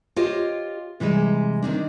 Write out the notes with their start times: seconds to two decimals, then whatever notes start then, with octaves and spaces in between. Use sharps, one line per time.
0.16 F4 G4 C5 C#5 D#5
1.00 C3 E3 G3 G#3
1.62 D#3 C4 D4